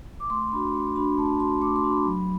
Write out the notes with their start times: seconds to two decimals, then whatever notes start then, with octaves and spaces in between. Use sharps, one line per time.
0.20 D6
0.30 A3 C6
0.52 D4 F#4 B5
0.74 A3 C6
0.96 D4 F#4 B5
1.18 A3 A5
1.40 D4 F#4 C6
1.61 A3 D6
1.76 C6
1.84 D4 F#4
1.91 B5
2.05 F#3